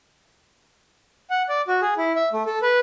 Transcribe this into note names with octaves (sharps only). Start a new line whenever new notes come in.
F#5
D5
F#4
G#4
E4
E5
A3
A4
B4